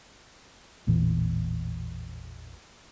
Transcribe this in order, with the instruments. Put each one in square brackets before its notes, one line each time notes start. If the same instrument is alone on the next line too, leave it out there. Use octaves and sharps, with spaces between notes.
[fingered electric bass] A1 E2 A#2 E3